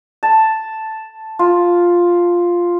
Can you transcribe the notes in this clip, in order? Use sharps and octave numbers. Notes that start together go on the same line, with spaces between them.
A5
F4